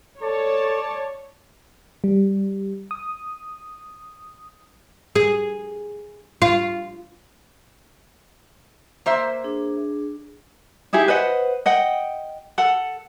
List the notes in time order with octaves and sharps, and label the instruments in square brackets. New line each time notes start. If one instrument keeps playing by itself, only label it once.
[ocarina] A4 [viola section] C#5 [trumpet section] D5 A5
[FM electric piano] G3
D#6
[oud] G#4
F4
[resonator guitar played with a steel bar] A#3 C5 E5
[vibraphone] D4 G#4
[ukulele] D#4 E4 G4 G#4
B4 C5 D#5 F#5
D#5 F#5 G5
A4 F#5